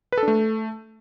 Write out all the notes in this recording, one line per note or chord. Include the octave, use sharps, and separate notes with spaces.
B4
A4
D4
A3